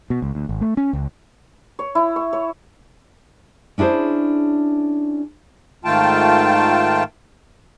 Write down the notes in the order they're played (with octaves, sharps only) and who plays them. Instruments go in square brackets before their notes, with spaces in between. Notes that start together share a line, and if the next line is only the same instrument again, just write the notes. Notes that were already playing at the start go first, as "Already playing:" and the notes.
[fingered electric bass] B2
C#2
D2
G#1
A3
C#4
C#2
[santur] C#5
E4
C#6
C#5
[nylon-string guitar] C#4 D4 E4 G#4 C5
[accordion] G#2 D#3 A3 F4 G5 A5